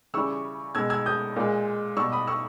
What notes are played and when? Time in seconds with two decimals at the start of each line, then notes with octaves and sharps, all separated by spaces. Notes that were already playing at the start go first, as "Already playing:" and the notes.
0.14 C#3 E3 G3 C#6 E6
0.75 B2 G#3 E6 G#6
0.90 E6 G#6
1.06 D#6 G6
1.36 A#2 G#3
1.97 B2 G3 C#6 E6
2.12 B5 D#6
2.27 C#6 E6